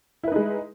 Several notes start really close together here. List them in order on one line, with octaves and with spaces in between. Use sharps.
E4 B4 D#4 G#3